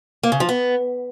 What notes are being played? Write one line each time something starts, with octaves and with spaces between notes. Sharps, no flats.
A#3
C#3
F3
B3